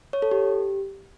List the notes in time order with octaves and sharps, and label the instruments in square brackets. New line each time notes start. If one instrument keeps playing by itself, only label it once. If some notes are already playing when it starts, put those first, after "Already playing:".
[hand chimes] C#5
A4
G4